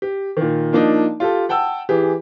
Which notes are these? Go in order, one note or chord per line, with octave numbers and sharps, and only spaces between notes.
G4
A#2 D#3
F3 A#3 D4 D#4
F4 G4 A4
F#5 G5 A5 E6
E3 G4 G#4